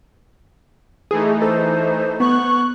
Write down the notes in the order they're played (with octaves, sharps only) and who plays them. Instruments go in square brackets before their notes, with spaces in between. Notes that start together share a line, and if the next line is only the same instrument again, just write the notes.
[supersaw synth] E3 A3 D#4 [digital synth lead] G#4
[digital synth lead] A4 [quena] C5
[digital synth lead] B3 [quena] C#6 [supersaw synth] F#6